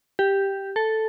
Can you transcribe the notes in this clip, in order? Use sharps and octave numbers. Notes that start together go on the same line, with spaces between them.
G4
A4